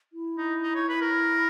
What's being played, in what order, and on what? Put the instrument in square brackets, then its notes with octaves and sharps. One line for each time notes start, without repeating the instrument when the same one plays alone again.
[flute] E4
[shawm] D#4
D#4
C#5
B4
A#4